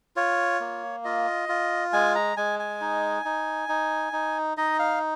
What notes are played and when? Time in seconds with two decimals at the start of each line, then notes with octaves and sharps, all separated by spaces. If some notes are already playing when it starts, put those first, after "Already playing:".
0.16 F4 C#5
0.60 A#3
1.05 F4 D#5
1.49 F4
1.93 G#3 G#5
2.15 A#5
2.37 G#3 G#5
2.59 G#5
2.81 D#4
3.25 D#4
3.69 D#4
4.13 D#4
4.57 D#4 D#5
4.79 F5